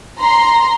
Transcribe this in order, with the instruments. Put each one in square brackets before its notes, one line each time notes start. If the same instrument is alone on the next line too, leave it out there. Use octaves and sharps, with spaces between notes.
[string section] A#5 C6